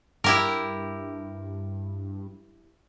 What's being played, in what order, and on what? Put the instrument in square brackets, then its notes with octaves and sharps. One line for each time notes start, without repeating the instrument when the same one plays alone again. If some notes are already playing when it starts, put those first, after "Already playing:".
[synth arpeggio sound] G2 [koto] E4 G4 A#4